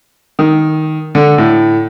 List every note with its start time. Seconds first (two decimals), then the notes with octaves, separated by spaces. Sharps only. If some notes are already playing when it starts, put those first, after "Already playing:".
0.39 D#3
1.15 D3
1.38 A2